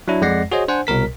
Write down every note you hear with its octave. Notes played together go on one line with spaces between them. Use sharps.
F#3 D4 E4
F2 G#3 D5 F#5 A#6 C7
F#4 G#4 C5 C#5 D#5
D4 C5 F#5 G#5
C2 B2 A#4 B6